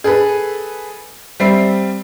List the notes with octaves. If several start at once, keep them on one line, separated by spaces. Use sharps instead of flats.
G#4 A4 B4
G3 C4 E5 C7